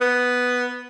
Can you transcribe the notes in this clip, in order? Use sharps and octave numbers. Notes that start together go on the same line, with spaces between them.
B3